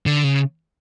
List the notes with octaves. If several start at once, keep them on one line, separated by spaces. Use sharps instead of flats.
D3
C#3